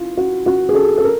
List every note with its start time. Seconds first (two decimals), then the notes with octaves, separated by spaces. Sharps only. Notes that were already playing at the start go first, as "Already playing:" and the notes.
Already playing: E4 F4
0.17 F#4
0.46 F#4
0.69 G#4
0.75 A4
0.98 A4
1.04 A#4